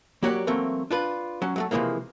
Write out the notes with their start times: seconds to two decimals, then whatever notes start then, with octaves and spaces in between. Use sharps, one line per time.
0.23 F#3 A#3 F#4 G4 C#5 D5
0.47 E3 F#3 A3 A#3 C4
0.91 D4 F4 B4
1.42 F#3 C#4
1.56 F#3 G#3 A3
1.71 C3 E3 F3 G#3 A#3